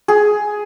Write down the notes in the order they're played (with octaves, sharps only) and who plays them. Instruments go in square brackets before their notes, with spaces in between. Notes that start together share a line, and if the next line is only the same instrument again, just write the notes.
[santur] G#4